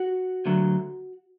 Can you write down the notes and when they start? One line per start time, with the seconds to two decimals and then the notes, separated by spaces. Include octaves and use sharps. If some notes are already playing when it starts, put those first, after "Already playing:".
Already playing: F#4 F#5
0.46 D2 D3 F#3